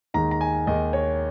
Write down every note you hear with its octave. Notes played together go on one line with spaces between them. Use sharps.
D#2 D#3 G#3 A#5
A#5
G#5
D#2 D#3 G#3 D#5
C#5